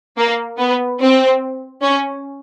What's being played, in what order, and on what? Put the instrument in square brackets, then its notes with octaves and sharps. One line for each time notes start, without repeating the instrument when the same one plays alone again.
[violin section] A#3
B3
C4
C#4